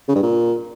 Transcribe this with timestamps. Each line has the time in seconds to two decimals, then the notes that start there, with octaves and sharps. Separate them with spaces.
0.08 C#3
0.15 G2
0.23 A#2